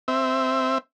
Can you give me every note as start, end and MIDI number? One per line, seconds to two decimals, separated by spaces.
0.08 0.78 60
0.08 0.78 76